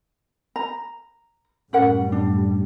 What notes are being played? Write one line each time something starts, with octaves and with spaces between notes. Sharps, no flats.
A#5
F#2 A2 G3 C#4 A#4 F#5
D4